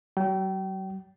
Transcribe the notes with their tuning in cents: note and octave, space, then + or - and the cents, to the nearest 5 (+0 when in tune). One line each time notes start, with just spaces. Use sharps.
F#3 +40 G5 -30